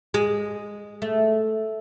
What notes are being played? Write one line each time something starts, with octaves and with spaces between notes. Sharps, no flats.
G#3
A3